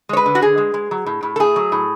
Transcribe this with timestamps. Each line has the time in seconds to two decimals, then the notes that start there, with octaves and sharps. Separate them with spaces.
0.09 G#3 C#5
0.17 B4
0.26 D3
0.35 F#4
0.41 D3 G#4
0.58 G#3
0.74 G#3
0.91 F#3
1.06 A2
1.23 A2
1.36 A4
1.40 A3 G#4
1.56 F#3
1.72 A2